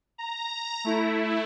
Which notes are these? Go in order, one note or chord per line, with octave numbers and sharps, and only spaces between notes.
A#5
A3 E4